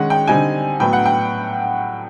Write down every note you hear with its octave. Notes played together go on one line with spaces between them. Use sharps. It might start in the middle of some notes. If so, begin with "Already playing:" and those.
Already playing: D#3 G#3 C#4 F#5
G5
D3 G3 C4 D#4 G#5
A2 F#3 B3 G5
F#5
G5